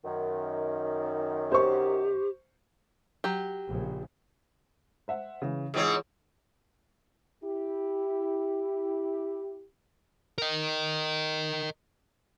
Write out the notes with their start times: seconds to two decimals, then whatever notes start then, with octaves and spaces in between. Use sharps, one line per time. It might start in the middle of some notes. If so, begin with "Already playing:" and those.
0.05 F#2 D#3
1.52 G4 C5 C#6
3.24 F#3 G4
3.66 A#1 C#3
5.08 C5 E5 F#5
5.42 C#3 E3
5.74 G#2 E3 C4 F4 G#4 C#5
7.44 E4 G4
10.38 A#4 D#5